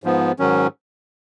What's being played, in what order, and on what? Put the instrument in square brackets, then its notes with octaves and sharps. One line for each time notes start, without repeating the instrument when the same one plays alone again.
[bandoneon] G#2 F3 B3
G#2 D#3 F#3 C#4